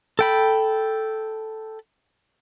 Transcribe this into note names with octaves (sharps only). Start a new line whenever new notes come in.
A4 G5 B5